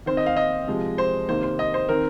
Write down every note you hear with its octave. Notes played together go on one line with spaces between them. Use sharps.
D#3 C4 C5
D#5
F5
D#5
C3 F3 G#3
C5
C3 D#3 A#3 C5
C5
D#5
C5
D#3 C4 A#4